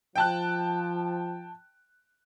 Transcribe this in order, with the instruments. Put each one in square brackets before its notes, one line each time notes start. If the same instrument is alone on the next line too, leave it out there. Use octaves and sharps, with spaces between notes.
[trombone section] F3 [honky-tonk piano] G5 A5 F#6